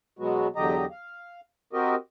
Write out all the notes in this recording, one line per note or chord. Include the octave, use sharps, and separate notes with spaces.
B2 F#3 G#3 B3 F#4
E2 D3 F#3 G4 D#5 A#5
F5
C4 F#4 G4 A#4 D#5